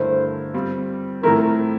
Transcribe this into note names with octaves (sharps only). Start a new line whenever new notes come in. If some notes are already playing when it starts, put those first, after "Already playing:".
Already playing: G2 D3 A3 E4 A#4 C5
G3 C4 F4
A2 F3 A3 C4 E4 A#4